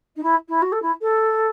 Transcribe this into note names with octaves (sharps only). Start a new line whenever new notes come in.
D#4
E4
E4
F#4
A4
E4
A4